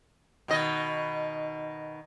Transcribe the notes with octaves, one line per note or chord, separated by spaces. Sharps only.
B2 D#3 D#5